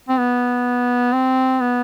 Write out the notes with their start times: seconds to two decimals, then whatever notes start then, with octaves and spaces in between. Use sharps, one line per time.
0.09 C4
0.19 B3
1.13 C4
1.61 B3